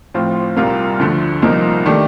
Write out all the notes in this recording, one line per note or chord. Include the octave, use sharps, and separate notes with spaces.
A2 F3 C4 F4
C2 A#2 G3 A#3 F4
D2 D3 F3 A3
C2 A#2 F3 A#3 D#4
D#3 A3 D4 G4